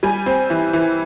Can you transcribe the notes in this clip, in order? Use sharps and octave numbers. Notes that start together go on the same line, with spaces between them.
G3 G#5
C4
E3
E3